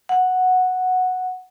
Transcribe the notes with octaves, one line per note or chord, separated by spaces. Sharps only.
F#5